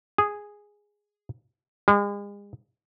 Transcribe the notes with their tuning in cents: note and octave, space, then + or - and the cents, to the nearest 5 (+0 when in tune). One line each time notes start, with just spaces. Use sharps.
G#4 -5
G#3 -40